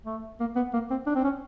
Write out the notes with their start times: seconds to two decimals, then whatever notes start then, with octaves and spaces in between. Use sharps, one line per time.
0.05 A3
0.40 A#3
0.56 B3
0.73 A#3
0.90 C4
1.06 D4
1.15 C4
1.24 C#4